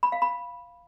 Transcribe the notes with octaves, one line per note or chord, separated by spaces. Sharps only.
B5
F5
B5